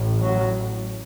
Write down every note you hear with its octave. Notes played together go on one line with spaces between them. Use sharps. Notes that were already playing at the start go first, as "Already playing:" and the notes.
Already playing: A1 A2
F#3